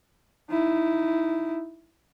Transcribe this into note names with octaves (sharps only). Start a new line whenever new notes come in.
D#4 E4